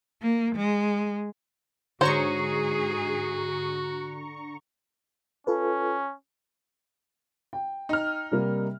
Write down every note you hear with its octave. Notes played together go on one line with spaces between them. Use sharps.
A#3
G#3
G#2 D3 F#4 G#4 C5 C#5 A#5 C#6
C#4 F4 A4 B4
G5
D#4 F6
C3 G3 A#3